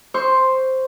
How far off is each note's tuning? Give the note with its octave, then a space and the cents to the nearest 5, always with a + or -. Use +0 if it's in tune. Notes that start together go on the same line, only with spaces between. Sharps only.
C5 +0 C#6 +10